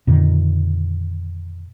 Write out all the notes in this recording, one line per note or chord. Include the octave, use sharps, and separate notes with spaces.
F2 A#2 D3 D#3